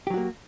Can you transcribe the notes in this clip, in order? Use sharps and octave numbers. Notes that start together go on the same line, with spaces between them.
F#3 A#3 F#4 G4